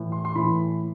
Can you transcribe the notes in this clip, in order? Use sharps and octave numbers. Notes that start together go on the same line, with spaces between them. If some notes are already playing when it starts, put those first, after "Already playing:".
Already playing: A2 E3
C6
C6
A2 E3 B5